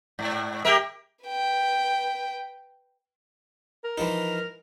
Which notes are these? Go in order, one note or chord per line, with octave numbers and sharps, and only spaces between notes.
G#2
G4 A#4 E5 G5
B4 G5
A#4
E3 F3 D#4